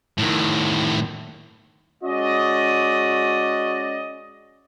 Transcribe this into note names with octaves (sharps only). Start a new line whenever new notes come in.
A2 D#3
G#3 C#4 F#4 D5 D#5